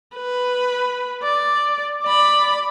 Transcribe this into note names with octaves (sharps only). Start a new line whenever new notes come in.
B4
D5
D5 B5